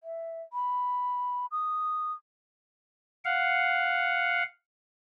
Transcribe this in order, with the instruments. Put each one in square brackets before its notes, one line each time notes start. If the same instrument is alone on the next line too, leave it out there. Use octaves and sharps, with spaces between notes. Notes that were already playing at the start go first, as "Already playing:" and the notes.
[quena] E5
B5
D#6
[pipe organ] F5 F#5